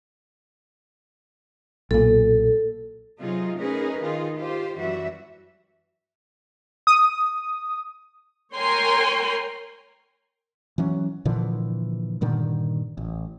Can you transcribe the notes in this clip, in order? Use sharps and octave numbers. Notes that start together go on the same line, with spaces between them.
B1 A#2 A4
C3 F#3 D#4 F4 G#4
A3 C#4 D#4 G#4 A#4 B4
D#3 D#4 F4 G#4
F4 G4 C5
F#2 E3 G3 F#4 E5
D#6
A#4 C#5 G5 G#5 A#5 C6
E3 F#3 C#4
A#2 D3 E3 F3
G2 A#2 D3 D#3
A1